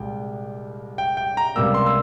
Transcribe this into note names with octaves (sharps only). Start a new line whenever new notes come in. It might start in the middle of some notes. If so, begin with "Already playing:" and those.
Already playing: C2 A#2 G#3 G5
G5
G5
A#5
C#2 C3 G3 A#3 E6
C6
E6